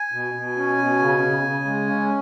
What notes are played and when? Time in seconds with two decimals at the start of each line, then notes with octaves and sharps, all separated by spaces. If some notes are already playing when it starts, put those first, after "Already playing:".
Already playing: G#5
0.12 B2
0.34 B2
0.56 C#4
0.78 B2
1.00 C#3
1.22 C#3
1.43 C#3
1.65 G#3
1.87 C#4